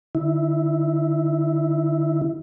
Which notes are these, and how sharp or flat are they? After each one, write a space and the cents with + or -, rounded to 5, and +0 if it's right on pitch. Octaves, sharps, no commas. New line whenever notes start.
D3 +30 E4 -10